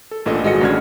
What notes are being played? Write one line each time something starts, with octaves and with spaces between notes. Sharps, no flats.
A4
A1 A#2 D4 A4 D#5
G#1 G#3 F#4 D#5 C#7
A1 C#3 D4 F6 G#6